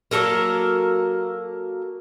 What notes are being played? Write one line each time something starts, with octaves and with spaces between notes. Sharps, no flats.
F#3 A#3 A4 A#4